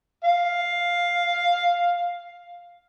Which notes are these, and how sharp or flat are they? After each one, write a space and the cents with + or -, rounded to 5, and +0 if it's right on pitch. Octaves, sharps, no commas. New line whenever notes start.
F5 +5